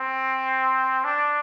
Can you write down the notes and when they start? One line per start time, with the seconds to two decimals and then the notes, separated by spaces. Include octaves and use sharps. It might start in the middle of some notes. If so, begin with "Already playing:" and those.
Already playing: C4
1.05 D4